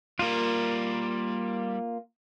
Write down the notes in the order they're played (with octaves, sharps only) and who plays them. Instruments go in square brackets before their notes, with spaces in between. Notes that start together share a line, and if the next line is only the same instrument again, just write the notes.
[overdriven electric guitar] G3 A#4 [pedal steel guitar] A#3 F4